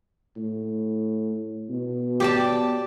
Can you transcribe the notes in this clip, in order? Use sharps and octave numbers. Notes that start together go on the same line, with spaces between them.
A2
B2
G4 D5 A5